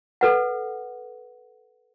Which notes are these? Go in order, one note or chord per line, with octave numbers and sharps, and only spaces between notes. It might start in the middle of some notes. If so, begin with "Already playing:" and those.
A4 B4 F#5